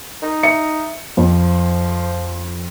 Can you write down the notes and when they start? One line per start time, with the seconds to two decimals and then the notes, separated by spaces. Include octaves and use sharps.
0.22 D#4
0.43 E5 C#7
1.17 F2 F3